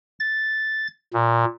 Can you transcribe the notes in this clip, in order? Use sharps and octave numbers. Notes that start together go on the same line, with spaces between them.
A6
A#2